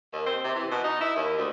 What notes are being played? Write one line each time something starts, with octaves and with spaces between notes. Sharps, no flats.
D#2
C4
C3
E3
B2
D#4
E4
D#2
D2